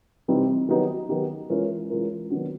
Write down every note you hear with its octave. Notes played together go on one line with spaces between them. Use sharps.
C3 E3 G3 C4 D#4
D#3 F#3 B3 D#4 G4
D#3 F#3 B3 D#4 G4
E3 G#3 C#4 F4 A#4
E3 G#3 C#4 F4 A#4
D#3 F#3 B3 D4 F#4